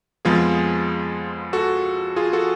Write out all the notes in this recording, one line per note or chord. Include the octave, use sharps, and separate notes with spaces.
F2 F3 G#3 B3 F4 G#4
F#4 A4
F4 G#4
F#4 A4